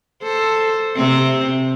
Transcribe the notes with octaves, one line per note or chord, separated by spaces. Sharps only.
A4 C5
C3 C4